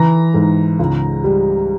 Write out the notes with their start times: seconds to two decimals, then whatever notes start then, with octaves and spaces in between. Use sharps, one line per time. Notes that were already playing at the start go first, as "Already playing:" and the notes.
Already playing: E3 A#5
0.34 G#2
0.79 C#2
1.24 G3